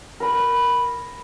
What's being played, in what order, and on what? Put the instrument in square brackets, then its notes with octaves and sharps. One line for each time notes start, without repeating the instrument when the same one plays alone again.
[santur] A#4 B5